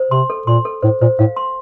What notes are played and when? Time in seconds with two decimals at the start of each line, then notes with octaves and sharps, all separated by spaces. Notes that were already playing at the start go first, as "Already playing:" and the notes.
Already playing: C5
0.11 C3 C6
0.30 A4
0.47 A#2 C6
0.65 A4
0.83 A2 C5
1.01 A#2 C5
1.19 A2 F5
1.36 C6